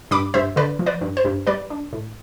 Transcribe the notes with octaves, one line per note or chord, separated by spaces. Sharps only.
G2 B5 D6
G2 C5 E5
D3 B4 D5
F3
B4 D5
G2
C5
G2
G3 B4 D5
D4
A2